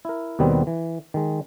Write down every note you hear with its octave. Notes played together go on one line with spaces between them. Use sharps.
E4 A#4
D#2 B2 D#3 G3 B3 C4
E3
D#3 G#3